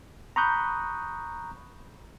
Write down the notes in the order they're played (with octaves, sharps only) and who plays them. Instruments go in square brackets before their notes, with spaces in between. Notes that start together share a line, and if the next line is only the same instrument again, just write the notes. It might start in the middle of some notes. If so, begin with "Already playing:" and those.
[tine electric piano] A#5 B5 C#6 D#6 F#6 G6